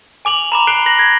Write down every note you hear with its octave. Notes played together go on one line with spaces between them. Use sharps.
G#5 D6 F7 F#7
A#5 B5 D6
F#6 C7 D7 F7 G7
A#6 F#7
G#6 A#6